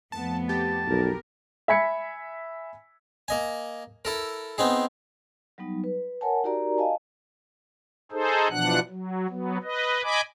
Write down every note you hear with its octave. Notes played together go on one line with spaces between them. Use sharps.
F2 A3 B3 A5
G4 A5
B1 B3 A#4
E5 G#5 B5 G#6 B6 C#7
A#3 D#5 G#5
E4 A4 A#4
B3 C4 D#4 G#4
F#3 G3 B3 D#4
B4
A#4 C#5 F#5 G#5 A5
D#4 F#4 G4 A#4 D5 A#5
D#5 F5 G#5 A5
D#4 G#4 A4 C5
B2 E3 F3 D4 F#5 F#6
F#3
F#3 B3
B4 D#5
D#5 G#5 B5 D6